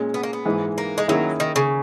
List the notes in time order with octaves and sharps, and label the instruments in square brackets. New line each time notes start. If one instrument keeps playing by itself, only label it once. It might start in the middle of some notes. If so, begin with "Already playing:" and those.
Already playing: [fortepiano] A#2 G#3 C#4
[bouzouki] B3
A#3
B3
[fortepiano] G#2 E3 G#3
[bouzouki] A#3
G#3
[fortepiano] D#3 A#3 C#4 E4 G#4 [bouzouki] F#3
[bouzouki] D#3
C#3